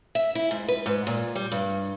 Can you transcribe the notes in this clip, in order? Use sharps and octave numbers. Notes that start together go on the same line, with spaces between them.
E5
E4
G#2
B4
G#2
A#2
G3
G2